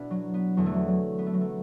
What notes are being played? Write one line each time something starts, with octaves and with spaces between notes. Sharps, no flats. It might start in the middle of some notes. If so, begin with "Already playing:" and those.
Already playing: B2 B3 D4 E4
F#3
B3
E2 D3 F#3
A3
F#3
F#3
B3
A3
F#3
A3